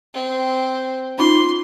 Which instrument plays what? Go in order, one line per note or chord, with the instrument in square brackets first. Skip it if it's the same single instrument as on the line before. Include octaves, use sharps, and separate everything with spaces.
[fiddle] C4
[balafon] C#4 D#4 F4 [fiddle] C6